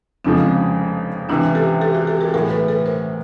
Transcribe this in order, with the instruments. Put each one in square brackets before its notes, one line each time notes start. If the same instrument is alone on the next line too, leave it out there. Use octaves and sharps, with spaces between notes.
[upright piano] F1 F2 C#3 F3 G#3 [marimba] C4 D4
[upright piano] C#2 C3 E3 [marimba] D4 E4
[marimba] G4 A4
G4 A4
F#4 G#4
G4 A4
G#4 A#4
A4
[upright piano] B1 A2 E3 [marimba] G#4 A#4
[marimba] A4 B4
A4 B4
A#4 C5